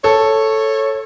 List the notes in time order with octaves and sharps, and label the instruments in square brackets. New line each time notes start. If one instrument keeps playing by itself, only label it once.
[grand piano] A4 [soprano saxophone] C#5